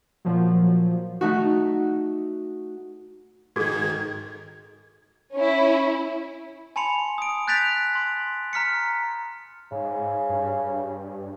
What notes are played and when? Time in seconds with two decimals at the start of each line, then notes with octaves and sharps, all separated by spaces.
0.25 A#2 F3 F#3
1.21 A3 D#4 F#4
3.56 G#2 D#3 F#4 G#4 A4 G#6
5.35 C#4 E4
6.76 G#5 A5 B5 C6 C#7 F7
7.18 D#6 D7
7.48 F#6 G6 A6 B6 D7 F7
7.95 C6
8.53 A#5 F6 B6 C#7
9.72 G#2 C#3
10.29 G2